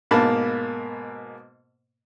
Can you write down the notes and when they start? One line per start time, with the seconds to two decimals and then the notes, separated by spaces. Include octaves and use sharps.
0.11 G#2 B2 A#3 A5 B5